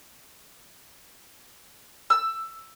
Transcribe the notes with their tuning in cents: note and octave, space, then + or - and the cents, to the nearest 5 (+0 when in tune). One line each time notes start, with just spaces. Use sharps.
E6 +10